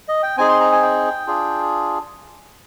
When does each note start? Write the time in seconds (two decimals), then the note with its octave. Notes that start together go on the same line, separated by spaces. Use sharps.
0.08 D#5
0.23 G5
0.38 C4 D#4 G#4 G#5
0.49 C6
0.61 A#5
0.72 G#5
0.82 G5
1.27 D4 F4 G#4